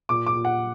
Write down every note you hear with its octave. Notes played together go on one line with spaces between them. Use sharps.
A#2 D6
D6
A#2
F#5